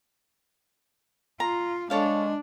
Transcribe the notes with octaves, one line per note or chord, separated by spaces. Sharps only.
F4 A#5
G#3 D4 A4 C#5 F5